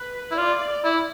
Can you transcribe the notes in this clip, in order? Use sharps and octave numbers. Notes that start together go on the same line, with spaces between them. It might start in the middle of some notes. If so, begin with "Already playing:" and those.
Already playing: B4
E4
F4 D5
E4